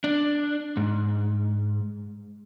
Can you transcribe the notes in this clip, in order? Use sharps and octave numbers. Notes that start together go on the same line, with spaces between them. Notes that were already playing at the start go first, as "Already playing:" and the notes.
D4
G#2